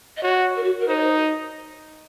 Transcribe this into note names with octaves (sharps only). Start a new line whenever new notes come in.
D#5
F#4 C#5
A#4
F#4
A#4
D#4 C5
C#5
C5